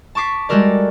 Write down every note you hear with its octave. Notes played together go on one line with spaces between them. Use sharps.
A5 C#6 D6 B6 C7
G3 G#3 F#4 A4 A#4 D5